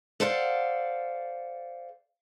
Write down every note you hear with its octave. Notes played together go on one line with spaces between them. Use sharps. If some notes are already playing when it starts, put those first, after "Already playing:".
A4 C5 D5 F5 F#5